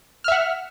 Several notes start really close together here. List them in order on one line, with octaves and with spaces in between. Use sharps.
F6 E5 F#5